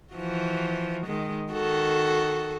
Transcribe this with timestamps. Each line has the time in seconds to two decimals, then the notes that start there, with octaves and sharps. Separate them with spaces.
0.13 E3 F3 F#4
1.06 D#3 G#3
1.52 D#3 F#4 A4